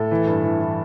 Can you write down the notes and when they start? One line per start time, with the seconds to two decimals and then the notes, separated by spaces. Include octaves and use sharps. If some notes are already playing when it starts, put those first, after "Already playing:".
Already playing: A2 A4
0.11 E3
0.27 G2
0.44 E3
0.61 E3